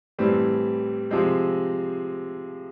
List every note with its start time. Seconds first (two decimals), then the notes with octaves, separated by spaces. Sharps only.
0.19 A2 E3 G3 C4
1.11 C3 F3 G#3 C4